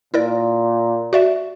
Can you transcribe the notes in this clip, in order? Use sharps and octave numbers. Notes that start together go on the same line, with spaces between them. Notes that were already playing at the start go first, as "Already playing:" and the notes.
A#2 E4 A#4 D5
F#4 D5 E5